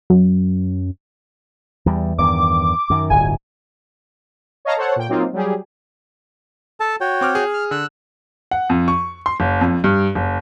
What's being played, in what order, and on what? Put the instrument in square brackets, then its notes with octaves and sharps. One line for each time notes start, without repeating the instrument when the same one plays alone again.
[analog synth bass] F#2
[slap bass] E2 G3
[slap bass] E2 G2 D#3 [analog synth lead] D6
[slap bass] F#2 D#3
[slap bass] D1 G1 [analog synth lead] G#5
[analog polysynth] C#5 D#5 F5 A5 A#5
A4 C5 C#5 F#5
A#2 G5
F#3 A#3 C4 D#4 F4
F#3 G3 G4 G#4
[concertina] A4 A5
F#4 C#5 G5
[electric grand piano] C4 D6 F6
G#4
[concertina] F6
[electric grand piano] D3 [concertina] E6 F#6
[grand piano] F#5
F2
C#6
C6
F#1
F2
G2
F#1